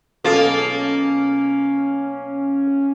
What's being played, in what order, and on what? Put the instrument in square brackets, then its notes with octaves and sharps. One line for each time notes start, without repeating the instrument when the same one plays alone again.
[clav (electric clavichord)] B1 F4 A5 [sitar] A#3 [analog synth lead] C#4 [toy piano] G#4 A4